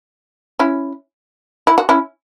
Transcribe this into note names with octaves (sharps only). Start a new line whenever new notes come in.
C#4 E4
E4
F#4
C#4 E4